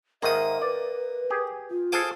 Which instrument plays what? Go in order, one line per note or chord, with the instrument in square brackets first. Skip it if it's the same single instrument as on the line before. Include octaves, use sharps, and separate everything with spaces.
[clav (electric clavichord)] G#2 D#3 [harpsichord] A#3 D#6 [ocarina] E5
[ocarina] B4 [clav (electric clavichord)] D5
[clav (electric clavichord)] G4 G#4
[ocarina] F4
[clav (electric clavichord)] G#4 A4 F5 [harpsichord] C5 G#5 D6